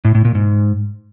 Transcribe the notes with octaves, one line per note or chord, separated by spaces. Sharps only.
A2
A2
A#2
G#2